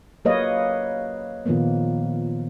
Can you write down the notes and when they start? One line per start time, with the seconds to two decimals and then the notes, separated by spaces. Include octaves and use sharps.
0.25 F#3 A#3 B4 C#5 D#5 F5
1.46 A#2 D#3 F3 A#3 B3